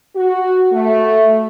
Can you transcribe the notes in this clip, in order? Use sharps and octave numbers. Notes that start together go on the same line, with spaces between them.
F#4
A3